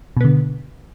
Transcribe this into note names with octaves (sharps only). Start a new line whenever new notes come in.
B2 D3 B3